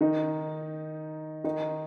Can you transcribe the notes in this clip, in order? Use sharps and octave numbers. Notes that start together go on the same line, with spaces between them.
D#3 D#4
D#3 D#4